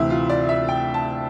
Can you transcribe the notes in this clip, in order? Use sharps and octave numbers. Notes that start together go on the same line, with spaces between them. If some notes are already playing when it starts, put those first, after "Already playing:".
Already playing: D2 C3 E3 E4
F4
D5
E5
G5
A5